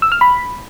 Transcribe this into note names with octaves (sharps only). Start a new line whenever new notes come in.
E6
F6
B5